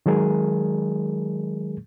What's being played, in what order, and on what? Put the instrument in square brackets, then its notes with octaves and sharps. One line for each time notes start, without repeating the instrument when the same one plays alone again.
[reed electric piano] D#3 F#3 G#3 G#4 A#4